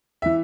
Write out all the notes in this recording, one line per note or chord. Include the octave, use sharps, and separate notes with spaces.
E3 E5